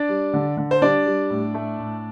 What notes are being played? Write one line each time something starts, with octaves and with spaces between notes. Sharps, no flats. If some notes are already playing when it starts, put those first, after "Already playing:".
Already playing: D4 D5
G3
D3
D3
C5
G3 D4 D5
G3
A2
A3
A2